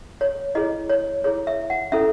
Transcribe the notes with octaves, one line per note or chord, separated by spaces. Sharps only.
C#5
E4 G#4 C#5 D#5
C#5
E4 G#4 C#5
E5
F#5
C#4 E4 A4 E5